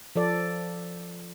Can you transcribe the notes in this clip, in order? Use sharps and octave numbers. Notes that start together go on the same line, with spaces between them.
F3 A4 D5